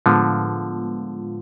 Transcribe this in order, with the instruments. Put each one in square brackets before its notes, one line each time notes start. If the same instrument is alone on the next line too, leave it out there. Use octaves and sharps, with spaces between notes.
[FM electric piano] A2 G#3 B3 F4 [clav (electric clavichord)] D3 F3